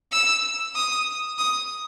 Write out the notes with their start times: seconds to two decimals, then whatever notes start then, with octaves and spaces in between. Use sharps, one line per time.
0.12 E6
0.75 D#6
1.38 D#6